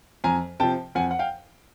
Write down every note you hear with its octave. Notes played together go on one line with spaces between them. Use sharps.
F2 G#5 A#5
C3 F3 G5 A5
F2 F#5 G#5
F#5
F5 G5